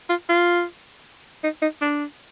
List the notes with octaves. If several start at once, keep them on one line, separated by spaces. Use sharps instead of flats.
F4
F4
D#4
D#4
D4